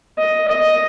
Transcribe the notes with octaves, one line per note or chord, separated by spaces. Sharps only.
D#5
D#5